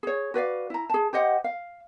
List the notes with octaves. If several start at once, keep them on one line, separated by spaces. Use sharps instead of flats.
G#4 C#5
F#4 B4 D5 F5
E4 A#5
G#4 A5
G4 C5 D#5 F#5
F5